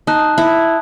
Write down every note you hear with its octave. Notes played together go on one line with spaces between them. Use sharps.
D#4 A5 D#6 F#6
E4